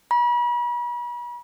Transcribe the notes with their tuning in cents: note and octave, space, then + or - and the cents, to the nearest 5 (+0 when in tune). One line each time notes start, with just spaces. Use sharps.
B5 -40